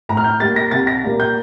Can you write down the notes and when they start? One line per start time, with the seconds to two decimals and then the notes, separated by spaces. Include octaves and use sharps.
0.09 A2 A#5
0.17 F6
0.24 G6
0.40 G3 A#3 A6
0.56 A#6
0.71 C2 A6
0.87 A#6
1.04 A#2 G3 A#3
1.20 G6